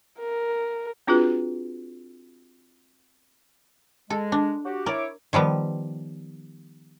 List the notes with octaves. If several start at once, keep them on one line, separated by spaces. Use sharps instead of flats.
A#4
C4 D4 F4 F#4 G#4 B4
G#3 A4
D4
F#4 G4
E4 A#4 C#5 D5 D6
D#3 F3 G3 B3